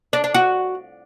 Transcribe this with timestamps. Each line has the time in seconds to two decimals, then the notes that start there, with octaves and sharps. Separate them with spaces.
0.13 D4
0.24 D4
0.34 F#4